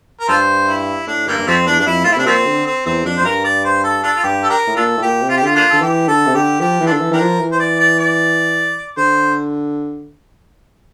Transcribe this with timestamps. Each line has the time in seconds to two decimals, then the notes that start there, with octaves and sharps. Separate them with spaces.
0.20 A#4
0.28 G2 F4 A4 C5
0.68 E4
1.07 A2 D4
1.27 G2 D3 G3 A#3
1.38 G2
1.47 F2 F3 A3 C4
1.67 E2 D4
1.79 G2 D4
1.86 F2 E4
2.04 A2 F4
2.12 E4
2.16 C3 D4
2.26 A#2 F3 A3 C4
2.46 D3
2.66 C4
2.86 E2 C4
3.05 F2 D4
3.17 F2 C5
3.25 G2 A#4
3.44 D5
3.64 C5
3.84 A4
4.03 D4 F4 A4
4.16 F4
4.24 G2 G4
4.43 A4
4.50 D4 G4 A#4
4.67 A2
4.76 A#2 D4 F4 A4
4.97 A2
5.02 A#2 G4
5.22 C3
5.29 F4
5.37 G4
5.42 D3 F4
5.55 A#3 D4 F4
5.70 D3 A4
5.81 E3 G4
6.08 D3 A4
6.26 C3
6.34 D3 G4
6.60 F3 G4
6.80 E3
6.86 D4 F4 A4
6.93 D3
7.01 E3
7.11 E3 D4 G4 A#4
7.21 F3
7.39 E3
7.52 C5
7.60 D5
7.79 D5
7.99 D5
8.97 D3 C5